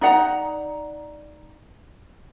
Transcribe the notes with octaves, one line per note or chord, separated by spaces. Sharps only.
D#4 D5 F#5 A#5